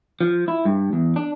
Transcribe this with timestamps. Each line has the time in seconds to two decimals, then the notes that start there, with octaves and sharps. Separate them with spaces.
0.21 F3
0.48 E4
0.65 G2
0.93 E2
1.16 D4